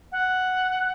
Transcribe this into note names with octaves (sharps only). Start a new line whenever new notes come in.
F#5